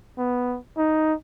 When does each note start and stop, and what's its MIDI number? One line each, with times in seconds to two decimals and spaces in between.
0.18 0.58 59
0.77 1.14 63